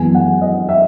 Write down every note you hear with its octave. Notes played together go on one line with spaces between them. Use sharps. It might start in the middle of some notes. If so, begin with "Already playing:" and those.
Already playing: F#2 E3 G#3 B3 G#5
F#5
D#5
E5